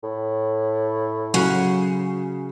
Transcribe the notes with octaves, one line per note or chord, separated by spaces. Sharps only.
A2
C#3 F#3 F#4